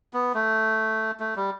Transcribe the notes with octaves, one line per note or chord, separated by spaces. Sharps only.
B3
A3
A3
G3